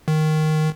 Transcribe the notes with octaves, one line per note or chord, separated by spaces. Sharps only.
D#3